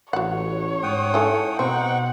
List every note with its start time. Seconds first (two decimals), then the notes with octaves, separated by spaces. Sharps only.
0.13 A1 F#4 C#5 F#5
0.83 G#2 F#5 G5 D#6
1.14 E4 G#4 A4
1.59 B2 C4 D#4 F#5 G5 C#6